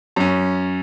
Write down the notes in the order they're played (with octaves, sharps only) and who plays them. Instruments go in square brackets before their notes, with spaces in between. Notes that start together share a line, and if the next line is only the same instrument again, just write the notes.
[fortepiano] F#2 C#4